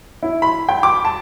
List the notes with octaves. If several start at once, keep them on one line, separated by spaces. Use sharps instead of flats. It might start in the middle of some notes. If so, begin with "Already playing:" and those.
E4
B5
G5
D6
A5